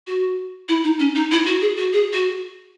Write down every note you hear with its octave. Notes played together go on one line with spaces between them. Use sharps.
F#4
E4
D#4
C#4
D#4
E4
F#4
G#4
F#4
G#4
F#4